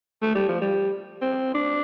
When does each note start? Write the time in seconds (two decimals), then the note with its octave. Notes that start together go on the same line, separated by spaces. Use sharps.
0.22 A3
0.35 G3
0.49 F3
0.61 G3
1.22 C4
1.55 D4